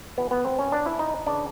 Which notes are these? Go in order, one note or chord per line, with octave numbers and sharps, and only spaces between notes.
E2 B2 B3
B3
C4
C#4
D4
E4
D#4
C#3 E3 D4